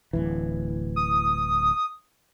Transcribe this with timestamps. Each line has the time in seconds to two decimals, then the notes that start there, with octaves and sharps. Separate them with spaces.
0.13 D1 G#1 E3
0.96 D#6